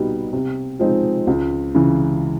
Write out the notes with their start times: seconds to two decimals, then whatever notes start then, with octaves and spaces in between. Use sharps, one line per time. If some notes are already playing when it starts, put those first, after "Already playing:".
Already playing: C2 B2 G3 B3 D#4
0.33 C3
0.79 F3 G#3 C4 D#4
1.27 C#2
1.74 C#3 E3